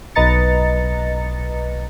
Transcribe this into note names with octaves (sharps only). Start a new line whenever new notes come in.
B1 B4 D#5 A#5 A6 C#7